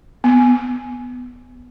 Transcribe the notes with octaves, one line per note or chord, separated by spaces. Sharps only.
B3